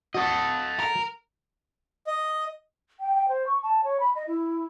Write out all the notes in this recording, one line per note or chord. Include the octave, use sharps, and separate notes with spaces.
F#4 A4 D#5
A#4
D#5
G5
G5
C5
C#6
A5
C#5
B5
D#5
E4